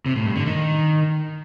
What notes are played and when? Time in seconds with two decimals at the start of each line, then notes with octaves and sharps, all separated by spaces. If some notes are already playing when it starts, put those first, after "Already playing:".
0.06 C3
0.16 A2
0.26 G2
0.36 D3
0.46 D#3